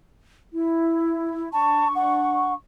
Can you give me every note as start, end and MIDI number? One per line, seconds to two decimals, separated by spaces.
0.53 1.51 64
1.52 2.53 62
1.52 1.88 81
1.52 2.53 85
1.95 2.53 78